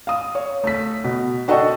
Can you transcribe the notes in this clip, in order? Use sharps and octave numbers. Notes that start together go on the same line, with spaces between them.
F5 D#6
C#5
A3 B6
B2
D4 F#4 A4 D#5 G5 C#6